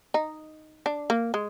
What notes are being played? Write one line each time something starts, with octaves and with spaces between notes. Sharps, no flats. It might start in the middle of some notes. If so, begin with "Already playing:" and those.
D#4
D4
A#3
G#3